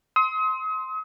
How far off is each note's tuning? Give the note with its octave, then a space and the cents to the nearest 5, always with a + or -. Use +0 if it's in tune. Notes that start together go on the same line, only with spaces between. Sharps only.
C6 +0 D#6 +40